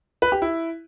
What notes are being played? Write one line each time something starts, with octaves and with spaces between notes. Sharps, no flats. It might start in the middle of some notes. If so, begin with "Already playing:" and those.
B4
G4
E4